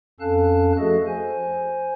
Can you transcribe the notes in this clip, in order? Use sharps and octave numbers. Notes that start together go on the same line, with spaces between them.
F2 C#4 A4 F5 A5 F#6
F3 A3 F#4 G#4 A4 D#5
C5 G#5